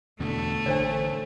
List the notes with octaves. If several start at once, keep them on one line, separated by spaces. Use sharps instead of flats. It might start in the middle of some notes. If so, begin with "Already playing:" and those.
E2 B2 D3 A3
A1 D3 D4 C5 C#5